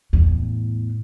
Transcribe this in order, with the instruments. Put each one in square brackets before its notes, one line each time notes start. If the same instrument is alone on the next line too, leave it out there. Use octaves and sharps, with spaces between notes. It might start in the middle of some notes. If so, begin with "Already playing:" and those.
[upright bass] E2 A2